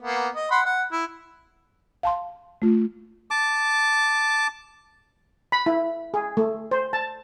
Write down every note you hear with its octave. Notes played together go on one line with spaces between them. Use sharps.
A#3 B3
D#5
F#5 B5 C6
F#5
E4
F5 A5 C6
A3 F4
A5 D6
B5
E4
G#4
A3
C5
A5